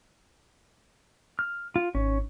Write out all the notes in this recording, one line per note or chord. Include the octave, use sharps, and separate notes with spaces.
F6
F4
G#1 C#4